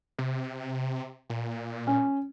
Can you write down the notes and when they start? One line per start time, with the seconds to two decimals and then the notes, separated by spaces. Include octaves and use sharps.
0.18 C3
1.30 A#2
1.87 C#4